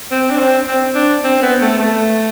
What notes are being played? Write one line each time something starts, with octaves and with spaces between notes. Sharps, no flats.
C4
D4
C4
C4
D4
C4
B3
A3
A3